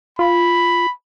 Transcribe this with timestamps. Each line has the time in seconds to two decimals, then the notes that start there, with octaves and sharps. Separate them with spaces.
0.19 F4 B5